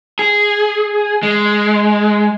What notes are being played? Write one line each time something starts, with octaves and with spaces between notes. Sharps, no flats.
G#4
G#3